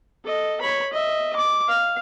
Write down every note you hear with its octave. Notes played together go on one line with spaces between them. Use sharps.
A4 D#5
C#5 B5
D#5 E5
D6
F5